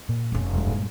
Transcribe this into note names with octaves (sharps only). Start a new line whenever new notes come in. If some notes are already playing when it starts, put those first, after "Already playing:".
A#2
F1 C#4
E1 G#3
G2 A#2 G#3